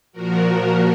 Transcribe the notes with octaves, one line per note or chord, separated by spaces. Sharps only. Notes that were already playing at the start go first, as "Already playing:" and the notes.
A#2 F3 F#4 A#4